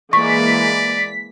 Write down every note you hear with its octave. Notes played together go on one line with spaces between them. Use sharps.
E3 G#3 A#3 D5 C#6 B6